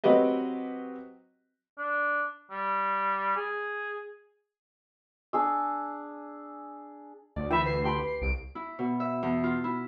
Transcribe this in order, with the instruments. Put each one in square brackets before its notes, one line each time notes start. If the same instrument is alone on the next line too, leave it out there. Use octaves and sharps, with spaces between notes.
[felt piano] F#3 C4 F#4 G4 B4 D#5
[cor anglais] D4
G3
G#4
[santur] D4 G#4 E6
[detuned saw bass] D2 [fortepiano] D5
[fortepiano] E3 [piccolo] E5 [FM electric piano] G5 B5
[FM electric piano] B4 [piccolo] C7
[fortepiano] G4 G5 B5 [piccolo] C6
[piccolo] C7
[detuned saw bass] C2 [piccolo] D7
[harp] E4
B2
E5
E2
F4
E4